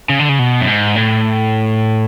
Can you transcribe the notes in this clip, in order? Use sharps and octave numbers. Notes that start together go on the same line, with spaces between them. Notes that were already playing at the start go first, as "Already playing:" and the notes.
C#3
D3
C#3
B2
F#2
G#2
A2